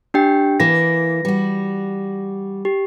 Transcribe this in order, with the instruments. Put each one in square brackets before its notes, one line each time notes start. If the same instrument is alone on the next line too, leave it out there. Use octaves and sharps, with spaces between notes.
[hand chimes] D4 G4 G5
[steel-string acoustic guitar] E3 A#3 [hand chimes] A#6
[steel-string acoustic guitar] G3 F#4
[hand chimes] G4